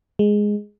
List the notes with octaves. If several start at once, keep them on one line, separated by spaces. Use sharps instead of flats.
G#3